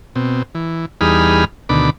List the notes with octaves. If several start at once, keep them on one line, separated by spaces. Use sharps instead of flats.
B2 C4
E3
E2 G3 D#4 G#4 B5 F6
D2 B2 D3 D#3 B5 D6